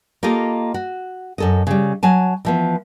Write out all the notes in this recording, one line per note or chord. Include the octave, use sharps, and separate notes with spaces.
A#3 F4 G4 A4 D#5
F#4
F#2 A4 D#5
C#3 G3
F#3 G#5 A5
E3 F3 B3